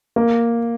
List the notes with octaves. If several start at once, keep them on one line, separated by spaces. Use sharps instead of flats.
A#3